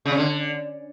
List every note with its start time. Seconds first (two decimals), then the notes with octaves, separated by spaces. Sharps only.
0.05 C#3
0.12 C#4
0.18 D3